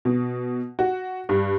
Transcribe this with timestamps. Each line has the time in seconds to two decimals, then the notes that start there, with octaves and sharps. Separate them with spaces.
0.05 B2
0.79 F#4
1.29 G2